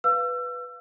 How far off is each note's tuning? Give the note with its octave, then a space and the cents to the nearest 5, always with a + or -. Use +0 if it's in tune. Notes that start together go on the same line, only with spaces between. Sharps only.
B4 +0 F5 -5 E6 +35